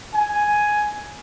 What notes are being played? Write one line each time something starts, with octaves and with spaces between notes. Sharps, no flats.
G#5